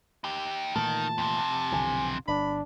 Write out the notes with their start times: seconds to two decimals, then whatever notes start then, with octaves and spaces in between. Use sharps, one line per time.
0.24 D#4 G4
0.76 A#2 D#3 E3 A3 A5
1.18 F2 C3
1.72 B1 D3 E3 G#5
2.28 G1 D4 B5